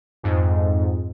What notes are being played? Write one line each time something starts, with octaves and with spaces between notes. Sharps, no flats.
F2 G#2